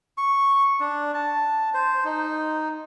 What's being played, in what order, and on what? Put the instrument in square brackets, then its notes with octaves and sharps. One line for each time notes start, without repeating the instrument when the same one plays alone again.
[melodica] C#6
D4
A5
C5
D#4